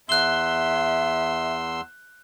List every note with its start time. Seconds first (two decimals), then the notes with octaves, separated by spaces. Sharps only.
0.09 E2 E5 C6 E6 F#6 G7